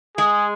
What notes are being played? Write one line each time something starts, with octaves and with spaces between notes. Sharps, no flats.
G#3 G#4